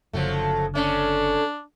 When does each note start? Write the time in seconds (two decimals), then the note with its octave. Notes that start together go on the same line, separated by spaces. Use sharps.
0.13 F#1 D3 F3 F#3 A3
0.75 A3 C#4 D4